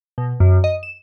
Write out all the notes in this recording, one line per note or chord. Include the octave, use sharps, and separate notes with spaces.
B2
F#2
D#5
E7